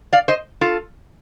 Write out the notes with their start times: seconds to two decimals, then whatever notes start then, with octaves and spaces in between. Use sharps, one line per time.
0.13 D5 F5
0.28 C5 D#5
0.61 F4 A4